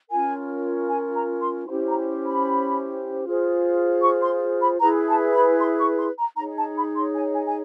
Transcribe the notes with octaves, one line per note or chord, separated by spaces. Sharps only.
C#4 F4 A#4 G#5
G#5
A#5
C6
C#4 E4 G4 C5 C6
A#5
B5
F4 G#4 C5
C#6
C6
B5
E4 G#4 B4 A#5
A5
B5
C6
C#6
C6
A#5
D#4 G#4 C#5 A#5
A5
B5
C6
G#5
G#5
G#5